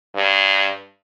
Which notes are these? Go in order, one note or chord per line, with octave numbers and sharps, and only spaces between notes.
G2